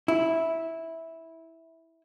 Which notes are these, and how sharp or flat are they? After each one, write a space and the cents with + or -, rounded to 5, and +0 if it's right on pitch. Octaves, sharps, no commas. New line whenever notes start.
E4 -10